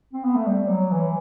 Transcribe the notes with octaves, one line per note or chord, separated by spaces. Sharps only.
C4
B3
A3
G3
F#3
E3